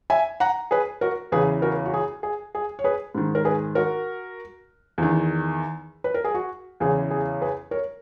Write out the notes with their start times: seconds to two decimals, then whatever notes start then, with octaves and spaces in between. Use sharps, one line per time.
0.10 E5 G#5
0.40 F#5 A#5
0.71 G#4 B4
1.01 F#4 A#4
1.32 E2 C#3 E3 G#4 B4
1.62 F#4 A#4
1.85 F#4
1.94 G#4
2.23 G#4
2.55 G#4
2.79 C#5
2.84 G#4 B4
3.15 G#2 D#3
3.35 A#4
3.45 G#4 B4
3.75 F#4 A#4
4.98 E2 D#3
6.04 B4
6.14 A#4
6.24 G#4
6.34 F#4
6.80 E2 C#3 E3 G#4
7.11 G#4
7.42 G#4 B4
7.71 A#4 C#5